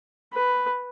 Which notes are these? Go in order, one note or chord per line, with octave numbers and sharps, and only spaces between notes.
B4